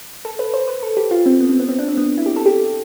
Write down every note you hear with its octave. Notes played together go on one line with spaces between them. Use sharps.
A4
B4
C5
B4
A4
G4
F4
C4
B3
C4
B3
C4
D4
C4
B3
E4
G4
A4
G4